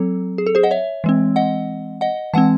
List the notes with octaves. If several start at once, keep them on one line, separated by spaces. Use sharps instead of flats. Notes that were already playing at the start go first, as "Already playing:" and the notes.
Already playing: F#3 C4 A4
G#4
A4
G#4 C5
D#5 F#5
C#5 E5
E3 G#3 C4
D#5 F#5
D#5 F#5
E3 G#3 C4 F#5 A5